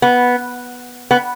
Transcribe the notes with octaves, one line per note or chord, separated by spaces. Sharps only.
B3
B3